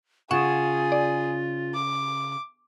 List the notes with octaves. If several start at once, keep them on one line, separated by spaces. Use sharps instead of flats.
C#3 F4 G#4 F#5 C#6 E7
D5
D6